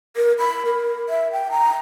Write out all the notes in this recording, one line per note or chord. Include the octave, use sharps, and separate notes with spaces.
A#4
B5
A#4
E5
G5
A#5